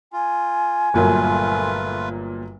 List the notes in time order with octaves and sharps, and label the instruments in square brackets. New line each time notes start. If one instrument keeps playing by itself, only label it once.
[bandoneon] F4 [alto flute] G#5
[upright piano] G1 A#2 F#3 [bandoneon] A3 F4 B4